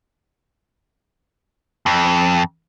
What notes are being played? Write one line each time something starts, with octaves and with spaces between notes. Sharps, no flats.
F2